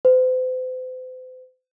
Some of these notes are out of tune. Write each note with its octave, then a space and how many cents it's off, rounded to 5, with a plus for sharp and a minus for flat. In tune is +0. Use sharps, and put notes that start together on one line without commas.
C5 -40